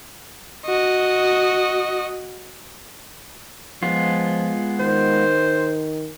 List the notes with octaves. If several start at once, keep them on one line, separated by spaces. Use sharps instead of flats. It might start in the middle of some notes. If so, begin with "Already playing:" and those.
F#4 D#5
F3 G#3 B3 F4
D#3 C5